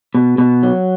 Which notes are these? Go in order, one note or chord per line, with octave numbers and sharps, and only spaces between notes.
B2
B2
F#3